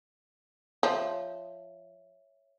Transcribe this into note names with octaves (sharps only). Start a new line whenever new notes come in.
F3 C#5 E5